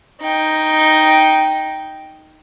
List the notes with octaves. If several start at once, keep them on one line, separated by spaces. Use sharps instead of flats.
D#4 G5